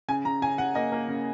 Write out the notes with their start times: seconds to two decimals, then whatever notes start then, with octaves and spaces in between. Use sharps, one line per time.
0.08 C#3 G#5
0.25 C#3 A#5
0.42 C#3 G#5
0.58 C#3 F#5
0.75 A#3 D#5
0.92 A#3
1.09 C#3